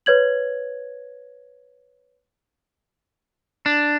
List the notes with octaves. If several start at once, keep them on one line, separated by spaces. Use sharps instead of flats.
B4 C#5 G#6 F#7
D4